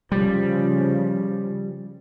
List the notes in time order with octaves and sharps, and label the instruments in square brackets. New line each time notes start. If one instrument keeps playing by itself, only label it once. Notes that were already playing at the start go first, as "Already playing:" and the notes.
[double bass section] C#3 F3 [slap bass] G3